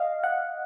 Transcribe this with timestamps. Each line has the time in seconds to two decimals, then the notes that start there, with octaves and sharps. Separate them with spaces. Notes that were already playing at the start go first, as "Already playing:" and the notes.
Already playing: D#5 F5
0.23 F#5